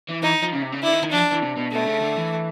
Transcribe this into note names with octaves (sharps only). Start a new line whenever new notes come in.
E3
E3 D#4
F3
C#3
C3
C#3
D3 E4
D#3
D#3
F3 D4
E3
C3
B2
B2 A3
C#3
D3
E3